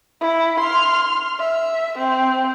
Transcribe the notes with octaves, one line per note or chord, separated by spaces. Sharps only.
E4
C6 F6
E5
C4